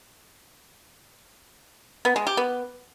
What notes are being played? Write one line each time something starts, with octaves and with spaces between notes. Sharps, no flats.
B3
G#3
G4
B3